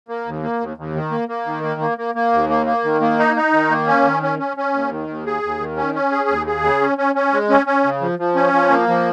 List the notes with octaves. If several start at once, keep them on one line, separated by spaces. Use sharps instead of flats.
A#3
D#2
A#3
D#2
D#2
D#3
A#3
A#3
D#3
A#3
A#3
A#3
A#3
D#2
A#3
A#3
D#3
A#3
D#4
D#4
D#3
A#3
C#4
D#3
C#4
C#4
C#4
D#2
D#3
D#2
G#4
D#2
D#3
C#4
C#4
G#4
D#2
G#4
C#3
C#4
C#4
C#4
G#3
C#4
C#4
C#3
F3
F3
C#4
F3
A#3
F3